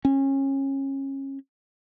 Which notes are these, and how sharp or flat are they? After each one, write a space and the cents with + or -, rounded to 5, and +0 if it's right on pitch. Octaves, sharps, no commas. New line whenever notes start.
C#4 -25